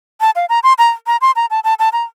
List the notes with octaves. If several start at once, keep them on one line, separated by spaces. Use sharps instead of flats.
A5
F5
A#5
C6
A#5
A#5
C6
A#5
A5
A5
A5
A#5